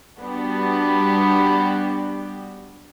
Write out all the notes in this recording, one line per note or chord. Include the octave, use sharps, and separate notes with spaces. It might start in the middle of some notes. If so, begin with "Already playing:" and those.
G3 B3 D4 F#4 G4